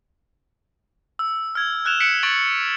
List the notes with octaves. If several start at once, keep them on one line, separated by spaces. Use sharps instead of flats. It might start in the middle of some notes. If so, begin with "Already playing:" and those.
E6
F6 G#6
F6 F#6 G#6 E7 F7
F#6 B6 C#7 D7 E7 F#7
C#6 A6 D7 F7 F#7